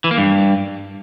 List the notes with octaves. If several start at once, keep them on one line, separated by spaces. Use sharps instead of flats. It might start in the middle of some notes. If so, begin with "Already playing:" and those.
E3
A#3
G2